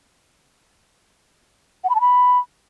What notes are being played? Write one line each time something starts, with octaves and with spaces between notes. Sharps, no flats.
F#5
B5
A5
B5